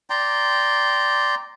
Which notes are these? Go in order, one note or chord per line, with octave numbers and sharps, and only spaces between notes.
D5 G5 A#5 C6